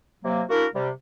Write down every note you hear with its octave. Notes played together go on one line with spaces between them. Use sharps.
C3 F#3 A#3
A#3 D4 E4 F#4 A#4
C3 G3